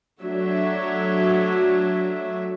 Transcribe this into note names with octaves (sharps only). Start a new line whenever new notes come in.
F#3 A3 D4 F#4 E5